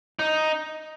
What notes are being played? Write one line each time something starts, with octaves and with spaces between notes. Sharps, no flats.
D#4